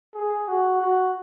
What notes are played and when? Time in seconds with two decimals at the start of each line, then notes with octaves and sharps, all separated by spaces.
0.14 G#4
0.48 F#4
0.81 F#4